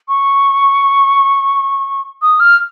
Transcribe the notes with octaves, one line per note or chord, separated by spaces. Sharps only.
C#6
D#6
F6